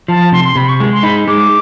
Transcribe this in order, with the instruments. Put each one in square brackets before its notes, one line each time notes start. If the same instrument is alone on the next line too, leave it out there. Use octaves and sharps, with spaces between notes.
[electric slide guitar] F3 [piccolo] A5
[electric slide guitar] C3 [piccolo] C6
[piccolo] C6
[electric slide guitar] C3 [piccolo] B5
[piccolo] C#6
[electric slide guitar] G#3
[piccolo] C6
[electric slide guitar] D#4 [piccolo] B5
[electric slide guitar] G#3 [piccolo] D6